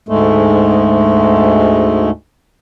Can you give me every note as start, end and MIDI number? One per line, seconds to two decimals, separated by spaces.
0.09 2.10 38
0.09 2.10 44
0.09 2.10 56
0.09 2.10 57